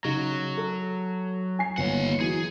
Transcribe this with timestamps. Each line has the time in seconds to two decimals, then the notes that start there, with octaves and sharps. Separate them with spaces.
0.04 C#3 F#3 D#4
0.57 A4
1.59 G#5 C7
1.78 G1 D#2 C#5 F#5
2.20 E3 F#3 G#4